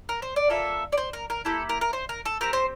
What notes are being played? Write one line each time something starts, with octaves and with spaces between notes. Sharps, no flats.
A#4
C5
D5
A#3 F4 A4 E5
D5
C5
A#4
A#4
A#3 E4 G4 A4
A#4
A#4
C5
A#4
A4
C4 G4 A#4
C5